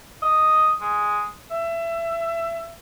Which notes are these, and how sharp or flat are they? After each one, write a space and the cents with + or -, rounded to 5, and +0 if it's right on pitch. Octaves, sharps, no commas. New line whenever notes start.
D#5 +0
G#3 +0
E5 +25